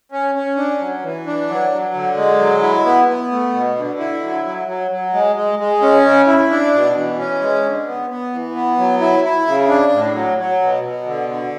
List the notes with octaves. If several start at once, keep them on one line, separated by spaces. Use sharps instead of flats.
C#4
C#4
D4
F#3
E3
D4
F#3
F#3
D3
G#3
F#3
E4
B3
B3
A3
B2
D3
E4
F#3
F#3
F#3
F#3
G#3
G#3
G#3
C#4
C#3
E4
D4
B2
E3
C#4
G#3
D3
B3
B3
E3
B3
F#3
E4
E4
C#3
D4
A2
F#3
F#3
B2
B2
D3
D3